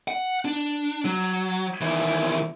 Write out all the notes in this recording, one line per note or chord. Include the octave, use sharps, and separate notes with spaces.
F#5
D4
F#3
D#2 E3